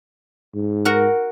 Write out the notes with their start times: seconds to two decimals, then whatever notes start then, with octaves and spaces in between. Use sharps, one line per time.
0.54 G#2
0.85 F#4 A#4 F#5